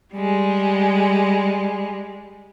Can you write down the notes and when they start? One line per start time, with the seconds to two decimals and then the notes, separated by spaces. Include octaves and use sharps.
0.13 G3 G#3